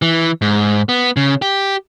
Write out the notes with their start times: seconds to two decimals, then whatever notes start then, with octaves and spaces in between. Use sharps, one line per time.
0.02 E3
0.42 G#2
0.89 B3
1.17 C#3
1.42 G4